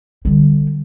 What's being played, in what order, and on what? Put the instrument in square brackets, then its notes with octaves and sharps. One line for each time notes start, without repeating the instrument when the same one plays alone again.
[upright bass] D3 G3